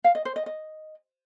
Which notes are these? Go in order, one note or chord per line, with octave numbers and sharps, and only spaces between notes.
F5
D#5
C5
D#5
D#5